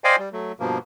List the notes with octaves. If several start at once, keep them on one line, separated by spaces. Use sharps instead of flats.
C5 D5 D#5 F5 G5 G#5
G3
F#3 A3
G2 B2 F3 A#3